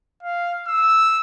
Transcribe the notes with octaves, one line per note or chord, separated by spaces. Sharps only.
F5
E6